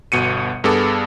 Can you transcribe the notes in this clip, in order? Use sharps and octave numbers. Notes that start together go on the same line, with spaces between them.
G1 B2 C#7 D#7
G2 B3 G#4 A4 D6